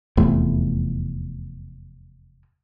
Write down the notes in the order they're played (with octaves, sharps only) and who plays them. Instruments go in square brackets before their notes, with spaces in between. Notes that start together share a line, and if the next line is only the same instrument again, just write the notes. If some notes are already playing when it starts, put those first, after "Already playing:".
[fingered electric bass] F1 E2 A2